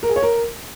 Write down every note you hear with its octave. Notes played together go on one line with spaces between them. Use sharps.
A#4
G#4
C#5
A#4